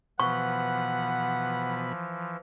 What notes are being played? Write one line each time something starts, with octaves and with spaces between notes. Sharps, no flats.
B2 E3 F3 F#5 B5 C#6